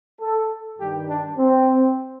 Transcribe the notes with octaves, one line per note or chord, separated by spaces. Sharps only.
A4
G2 D#3 G3 G4
D4
C4